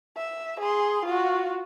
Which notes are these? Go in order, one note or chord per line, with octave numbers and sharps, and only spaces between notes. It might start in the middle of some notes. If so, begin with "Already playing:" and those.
E5
G#4 C6
F4 F#4